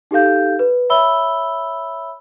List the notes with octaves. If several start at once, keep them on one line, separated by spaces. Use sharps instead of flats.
D#4 G4 A4 F5 G6
B4
C#5 E5 B5 E6 G7